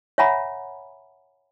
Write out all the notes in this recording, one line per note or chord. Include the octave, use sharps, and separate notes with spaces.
C#5 E5 F#5 G#5 A#5 B5